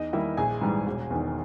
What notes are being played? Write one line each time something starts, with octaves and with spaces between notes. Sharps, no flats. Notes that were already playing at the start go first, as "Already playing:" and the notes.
Already playing: E2 D#4 D#5
D#3 G3 A#3 E4 E5
A#1 G#4 G#5
G#2 E3 G3
E1
E2 D#3